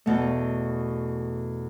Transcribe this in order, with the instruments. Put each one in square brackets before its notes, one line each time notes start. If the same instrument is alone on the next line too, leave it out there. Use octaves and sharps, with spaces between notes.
[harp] E2 B2 A3